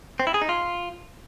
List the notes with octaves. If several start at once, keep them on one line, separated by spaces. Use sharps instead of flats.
C4
E4
G#4
D#4
F4